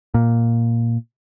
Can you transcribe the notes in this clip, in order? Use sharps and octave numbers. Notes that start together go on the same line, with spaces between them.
A#2